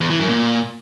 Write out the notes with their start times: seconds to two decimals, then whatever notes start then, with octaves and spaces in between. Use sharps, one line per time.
0.01 E2
0.10 E3
0.19 F#2
0.29 A#2